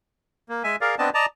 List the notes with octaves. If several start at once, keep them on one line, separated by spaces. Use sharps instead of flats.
A#3
G#3 E5 G#5
G#4 A#4 D5 F5
B3 C4 D4 D5 D#5 A5
D5 D#5 A5 A#5